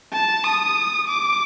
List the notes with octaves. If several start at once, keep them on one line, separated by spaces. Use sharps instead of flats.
A5
D#6
D6